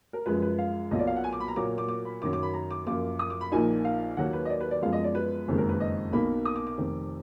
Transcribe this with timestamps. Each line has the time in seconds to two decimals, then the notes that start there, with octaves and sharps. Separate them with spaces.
0.13 A#4
0.26 F#2 F3 G#3 B4
0.42 B4
0.58 F5
0.91 B1 B2 F#3 A#3 F4 D#5
0.99 D5
1.07 F5
1.16 F#5
1.24 G#5
1.33 D6
1.40 B5
1.48 A#5
1.56 A#2 F#3 A#3 D6
1.78 D6
1.88 D6
2.05 B5
2.22 F#2 D#3 F#3 D6
2.33 D6
2.43 B5
2.54 A#5
2.71 D6
2.87 F#2 F3 A#3 F4 D6
3.19 D#6
3.30 D6
3.41 B5
3.52 A#1 A#2 F3 A#3 D#4 G#5
3.85 F5
4.17 D#2 D#3 F#3 A#3 F#5
4.33 B4
4.45 D#5
4.50 D5
4.61 B4
4.71 D5
4.82 F#2 F3 G#3 B3 F5
4.93 D#5
5.04 D5
5.15 B4
5.48 F#1 F2 D#3 G#3
5.58 A#4
5.69 B4
5.80 D#5
6.13 B1 B2 A#3 D#4 B5
6.45 D#6
6.56 D6
6.67 D6
6.78 F1 F2 D#3